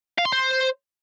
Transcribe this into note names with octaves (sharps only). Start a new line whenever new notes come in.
F5
C6
C5